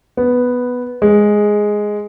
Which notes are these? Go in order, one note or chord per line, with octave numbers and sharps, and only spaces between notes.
B3
G#3